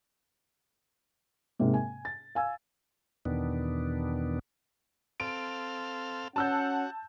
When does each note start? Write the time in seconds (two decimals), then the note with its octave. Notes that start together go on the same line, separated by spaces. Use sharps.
1.59 G#2 C3 G#3 A#3
1.74 G#5
2.05 A6
2.35 F5 G#5 E6
3.25 E2 B2 D#3 B3 D4
5.20 C4 A4 F5 D7
6.36 C#4 F#4 F#5 A5 E6 G6